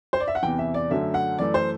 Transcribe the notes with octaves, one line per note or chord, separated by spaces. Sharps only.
C5
D5
E5
F#5
E2 C3 E3 G5
E5
D5
F#2 D3 F#3 A3 E5
F#5
F#2 E3 A3 D5
C5